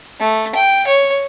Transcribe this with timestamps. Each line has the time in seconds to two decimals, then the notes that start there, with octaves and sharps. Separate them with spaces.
0.20 A3
0.55 G5
0.87 C#5